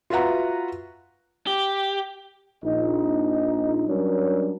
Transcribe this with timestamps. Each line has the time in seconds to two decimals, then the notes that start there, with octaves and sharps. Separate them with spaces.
0.10 F4 F#4 B4 E5 F#5 A#5
1.47 G4
2.64 A#1 D#4
3.88 F#3 G3 C#4 D4 A#4